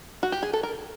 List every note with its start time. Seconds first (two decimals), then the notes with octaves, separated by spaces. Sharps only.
0.23 F#4
0.32 G4
0.43 G#4
0.53 A4
0.63 A#4